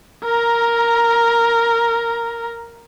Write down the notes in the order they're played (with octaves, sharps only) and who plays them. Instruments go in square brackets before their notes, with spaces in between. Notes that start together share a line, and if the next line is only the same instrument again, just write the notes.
[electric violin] A#4 A#5